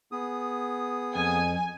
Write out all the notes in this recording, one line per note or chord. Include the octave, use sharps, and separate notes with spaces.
B3 G#4 D#6
F2 G#5